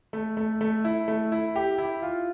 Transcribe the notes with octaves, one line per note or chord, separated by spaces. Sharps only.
A3
A3
A3
E4
A3
E4
G4
E4
F4